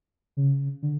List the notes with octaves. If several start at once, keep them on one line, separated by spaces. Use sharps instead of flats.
C#3
D3